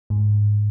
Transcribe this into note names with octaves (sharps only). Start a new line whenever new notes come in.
G#2